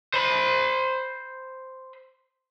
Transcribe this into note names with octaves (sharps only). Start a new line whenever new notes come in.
C5 B5